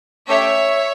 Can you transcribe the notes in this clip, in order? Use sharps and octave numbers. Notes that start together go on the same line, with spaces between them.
A3 C#4 G4 C#5 E5